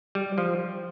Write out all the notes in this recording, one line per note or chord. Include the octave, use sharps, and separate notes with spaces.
G3
F3